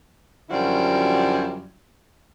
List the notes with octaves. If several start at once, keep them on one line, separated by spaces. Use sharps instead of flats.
F#2 D3 F3 G3 E4 F#4